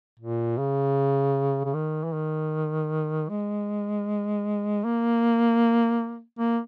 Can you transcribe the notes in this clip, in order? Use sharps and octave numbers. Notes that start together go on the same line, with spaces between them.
A#2
C#3
C#3
D#3
E3
D#3
G#3
A#3
A#3